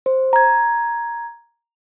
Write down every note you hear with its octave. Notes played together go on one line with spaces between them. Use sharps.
C5
A#5 G#6